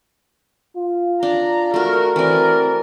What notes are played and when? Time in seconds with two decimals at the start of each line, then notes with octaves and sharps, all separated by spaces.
0.76 F4
1.23 D4 A#5
1.74 A3 F#4 A#4
2.16 E3 C4 A#4 D5